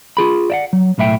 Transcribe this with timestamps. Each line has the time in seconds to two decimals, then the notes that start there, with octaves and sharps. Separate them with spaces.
0.17 F4 G#4 B5
0.50 D5 E5 F#5
0.73 F#3
0.98 B1 A2 E4 E5 G5